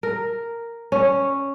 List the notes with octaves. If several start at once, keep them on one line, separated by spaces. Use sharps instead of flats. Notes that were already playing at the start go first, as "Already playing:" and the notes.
A#4
C#4